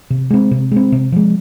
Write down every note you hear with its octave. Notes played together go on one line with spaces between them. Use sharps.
C3
G#3 C4
C3
G#3 C4
C3
F3 G#3